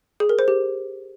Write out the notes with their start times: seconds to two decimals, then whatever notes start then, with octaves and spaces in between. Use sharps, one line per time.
0.20 G#4
0.29 A#4
0.39 C5
0.48 G4